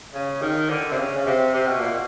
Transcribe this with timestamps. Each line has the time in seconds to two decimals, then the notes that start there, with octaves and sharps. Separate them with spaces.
0.14 C#3
0.42 D#3
0.70 D3
0.91 C3
0.98 C#3
1.17 C#3
1.26 C3
1.54 C3
1.66 B2
1.80 A#2
1.91 B2